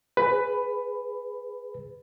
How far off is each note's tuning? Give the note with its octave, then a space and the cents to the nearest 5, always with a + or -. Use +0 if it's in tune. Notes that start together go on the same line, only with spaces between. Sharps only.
G#4 +0 B4 +15